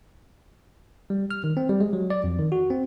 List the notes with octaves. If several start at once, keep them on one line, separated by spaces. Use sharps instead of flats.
G3
F6
D#3
C4
G3
G#3
F#3
D5
F2
D#3
F#4
C4